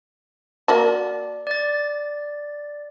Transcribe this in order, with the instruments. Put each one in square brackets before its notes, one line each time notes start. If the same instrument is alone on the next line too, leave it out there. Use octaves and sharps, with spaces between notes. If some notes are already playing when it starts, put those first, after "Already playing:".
[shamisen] A#3 F#4 A5 [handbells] D5
[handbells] D5 A6